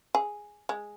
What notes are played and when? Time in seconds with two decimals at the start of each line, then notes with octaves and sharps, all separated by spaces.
0.15 G#4
0.69 G#3